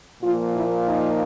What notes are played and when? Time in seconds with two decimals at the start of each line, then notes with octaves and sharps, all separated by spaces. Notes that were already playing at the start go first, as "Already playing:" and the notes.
0.22 A#2 F3 A#3 F4
0.54 E4
0.86 D#4